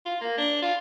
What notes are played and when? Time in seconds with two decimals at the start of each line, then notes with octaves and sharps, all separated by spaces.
0.06 F4
0.21 A#3
0.38 D4
0.62 F4